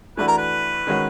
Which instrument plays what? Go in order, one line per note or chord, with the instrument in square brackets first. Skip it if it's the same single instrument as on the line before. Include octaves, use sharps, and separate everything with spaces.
[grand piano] E3 A3 D4 F#4 [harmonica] B4
[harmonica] A#4
B4
[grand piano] D#3 G#3 C#4 F#4